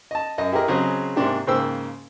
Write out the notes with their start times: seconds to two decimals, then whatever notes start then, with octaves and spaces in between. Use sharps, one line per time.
0.11 D#5 A5
0.38 F#2 D#5
0.52 E4 G4 G#4 A#4 D#5
0.68 C#3 F#3 C4 G#4 D#5 D#6
1.16 G#2 C3 A#3 C4 D4 G4
1.47 G#2 C#3 A#3 C5 G5 E6